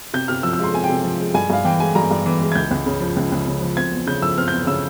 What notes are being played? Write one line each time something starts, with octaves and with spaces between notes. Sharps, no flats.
C3 G6
C3 F6
F3 E6
E6
G#3 C6
C3 G#5
G5
C3
F3
G#3
G2 G#5
G2 F5
E3 G5
G#3 G#5
G2 A#5
G2
E3
G#3
G#6
C#2 G6
C#2
C#3
F3
C#2
C#2
C#3
F3
C4 G#6
E2
C#3 G6
F3 E6
C4 F6
E2 G6
C#3 E6